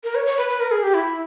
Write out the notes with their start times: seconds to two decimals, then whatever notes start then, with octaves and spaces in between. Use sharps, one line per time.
0.04 A#4
0.15 C#5
0.26 C#5
0.37 B4
0.49 B4
0.60 A#4
0.71 G#4
0.83 G4
0.94 E4